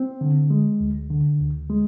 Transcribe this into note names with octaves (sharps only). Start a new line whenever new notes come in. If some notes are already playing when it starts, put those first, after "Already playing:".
Already playing: C4
D3
G#3
D2
D3
D2
G#3